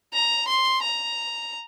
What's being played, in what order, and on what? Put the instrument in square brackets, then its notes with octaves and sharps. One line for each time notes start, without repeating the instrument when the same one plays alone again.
[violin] A#5
C6
A#5